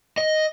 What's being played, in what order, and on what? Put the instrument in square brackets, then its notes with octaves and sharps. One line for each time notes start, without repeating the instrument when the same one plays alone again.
[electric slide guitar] D#5